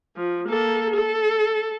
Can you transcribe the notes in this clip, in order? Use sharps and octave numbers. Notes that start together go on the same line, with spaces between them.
F3
A#3 A4
A4